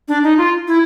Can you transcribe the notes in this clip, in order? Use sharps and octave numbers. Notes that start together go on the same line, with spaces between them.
D4
D#4
F4
E4